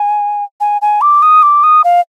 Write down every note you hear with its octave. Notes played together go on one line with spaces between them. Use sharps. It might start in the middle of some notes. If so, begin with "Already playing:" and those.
Already playing: G#5
G#5
G#5
D6
D#6
D6
D#6
F5